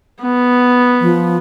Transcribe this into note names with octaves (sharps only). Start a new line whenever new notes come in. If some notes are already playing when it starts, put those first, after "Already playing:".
B3
F3